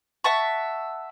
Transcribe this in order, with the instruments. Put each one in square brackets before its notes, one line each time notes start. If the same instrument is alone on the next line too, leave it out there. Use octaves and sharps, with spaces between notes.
[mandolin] E5 F#5 A5 C#6